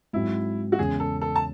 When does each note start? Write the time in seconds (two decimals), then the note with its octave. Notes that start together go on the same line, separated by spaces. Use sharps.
0.13 G#2 F#3 C4 E4
0.72 F#4
0.78 E2 C#3 G#3 C#4 G#4
1.00 A4
1.21 A4
1.36 A5